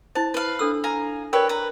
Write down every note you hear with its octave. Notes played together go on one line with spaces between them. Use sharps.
E4 C5 A5
B4 F5
D4 A4 E6
F5 G#5 A#5
G4 A#4 B4 C#5 D5
B4 A#5